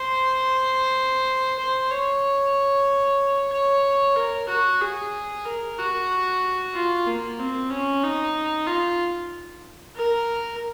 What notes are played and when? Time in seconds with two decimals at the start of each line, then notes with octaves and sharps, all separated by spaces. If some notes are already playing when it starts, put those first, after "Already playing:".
Already playing: C5
1.59 C5
1.91 C#5
3.52 C#5
4.16 A#4
4.49 F#4
4.81 G#4
5.46 A#4
5.78 F#4
6.74 F4
7.06 A#3
7.39 C4
7.70 C#4
8.03 D#4
8.67 F4
9.96 A#4